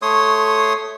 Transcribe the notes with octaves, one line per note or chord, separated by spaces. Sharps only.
A3 C#5 C6 D#6